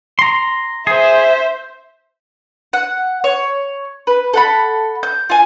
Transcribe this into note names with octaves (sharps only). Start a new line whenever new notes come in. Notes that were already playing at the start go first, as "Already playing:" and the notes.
A#5 C6
G#4 C5 E5
F#5
C#5
B4
A4 F#5 B5
G6
F4 G#5